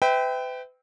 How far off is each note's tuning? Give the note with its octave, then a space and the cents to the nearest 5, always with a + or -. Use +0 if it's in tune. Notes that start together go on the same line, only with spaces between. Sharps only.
B4 +40 E5 -25 G5 +0